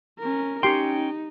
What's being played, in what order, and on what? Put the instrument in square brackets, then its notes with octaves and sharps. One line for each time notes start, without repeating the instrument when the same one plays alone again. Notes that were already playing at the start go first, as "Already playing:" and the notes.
[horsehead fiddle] C#4 A#4
[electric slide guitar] C#4 G5 [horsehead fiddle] D#4 [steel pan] G4 C6